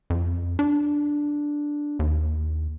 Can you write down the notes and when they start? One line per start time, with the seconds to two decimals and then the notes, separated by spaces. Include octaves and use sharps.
0.10 F2
0.59 D4
1.99 D#2